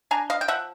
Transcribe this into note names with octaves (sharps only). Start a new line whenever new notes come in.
D4 G#5 A#5
D#5 F5
G5
F3 E5 F#5